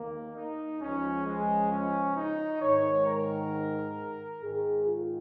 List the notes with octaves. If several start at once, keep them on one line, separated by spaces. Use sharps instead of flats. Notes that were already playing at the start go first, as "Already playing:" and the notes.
Already playing: D#2 D#3 A#3
D#4
C#2 C#3 F3 C#4
G#3
C#4
D#4
G#2 D#3 C#5
A#4
G#2 D#3 G#4
F4